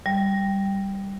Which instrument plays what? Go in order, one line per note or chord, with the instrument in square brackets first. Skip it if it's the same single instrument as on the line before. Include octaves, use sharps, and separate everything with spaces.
[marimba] G3